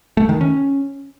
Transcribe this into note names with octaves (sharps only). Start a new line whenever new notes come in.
A3
D#3
C#4